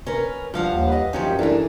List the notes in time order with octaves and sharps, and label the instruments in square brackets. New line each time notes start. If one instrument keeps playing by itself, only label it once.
[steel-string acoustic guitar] C#4 A#4 B4
[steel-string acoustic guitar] G2 F5 F#5 [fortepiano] F3
[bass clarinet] D#2
[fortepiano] B4 D#5
[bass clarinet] F#2 [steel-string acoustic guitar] F3 F#3 G4 [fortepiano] C#4 D#4
[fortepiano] E3 A3 A#4 [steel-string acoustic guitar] D4 G#4